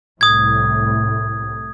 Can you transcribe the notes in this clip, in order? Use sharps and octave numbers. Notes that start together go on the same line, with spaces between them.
C2 A2 D#6 G#6